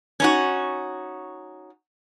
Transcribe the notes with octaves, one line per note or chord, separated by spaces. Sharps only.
C#4 D#4 F#4